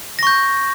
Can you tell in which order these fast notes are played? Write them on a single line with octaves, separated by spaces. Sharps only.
A#6 C#6 G6